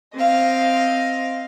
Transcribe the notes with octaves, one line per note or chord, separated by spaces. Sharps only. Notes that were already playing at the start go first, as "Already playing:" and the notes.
C4 D#5 F5